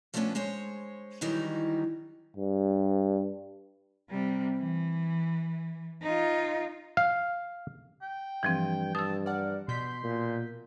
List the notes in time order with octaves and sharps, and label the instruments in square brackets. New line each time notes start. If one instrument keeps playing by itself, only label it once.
[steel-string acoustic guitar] F3 G3 A3 B3 C#4 D4
G#3 C5 C#5
D#3 E3 F#3 G3 D#4
[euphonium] G2
[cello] C3 G3
E3
D#4 F4
[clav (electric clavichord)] F5
[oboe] G5
[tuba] G2 [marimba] E3 F3 C4
[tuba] G2 [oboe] A5 [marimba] D#6 E6
[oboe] A#4 [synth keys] D5 F#5
[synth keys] B2 G6 B6 [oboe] C6
[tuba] A#2